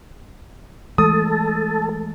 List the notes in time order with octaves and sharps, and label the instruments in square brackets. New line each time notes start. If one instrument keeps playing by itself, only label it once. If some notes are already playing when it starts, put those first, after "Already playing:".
[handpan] E3 G#3 A3 [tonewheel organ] A4 [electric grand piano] D#6